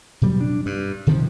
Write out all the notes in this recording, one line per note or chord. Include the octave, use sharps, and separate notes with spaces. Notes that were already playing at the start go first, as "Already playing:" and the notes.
B2 F#3 G3
D4
G2
C3 D#3 F3